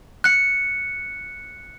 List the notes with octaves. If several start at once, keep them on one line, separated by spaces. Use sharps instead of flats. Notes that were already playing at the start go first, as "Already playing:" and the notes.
F#6 C#7